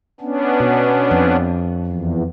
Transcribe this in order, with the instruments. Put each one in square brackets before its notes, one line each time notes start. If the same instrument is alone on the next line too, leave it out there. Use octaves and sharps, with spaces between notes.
[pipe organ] B3 C#4 D4
[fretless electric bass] B2
F2
[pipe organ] E2